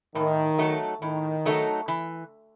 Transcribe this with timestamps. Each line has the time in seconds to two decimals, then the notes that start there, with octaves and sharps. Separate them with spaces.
0.15 A2 D#3
0.58 F#3 A3 D#4 A4
1.02 A2 D#3
1.46 F#3 A3 D#4 A4
1.88 E3